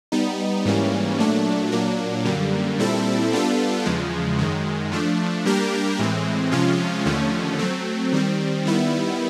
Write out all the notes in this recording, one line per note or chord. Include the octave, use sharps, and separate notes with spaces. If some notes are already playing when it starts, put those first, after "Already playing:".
G3 B3 D#4
G#2 E3 G3 A#3 C#4
A#2 F#3 A3 D4
A#2 F#3 A#3 D4
F#2 D3 G3 A#3
A#2 G3 C4 E4 A4
G3 B3 D4 F4 A4
E2 C#3 F3 G#3
F#2 D#3 G#3
F3 A3 D4
G3 A#3 D4 G4 A#4
A2 E3 G#3 C4
C3 F3 G#3 C#4 F4
D#2 D3 F3 A3 C#4
F#3 A3 C4
D#3 G3 C4
D#3 G3 B3 E4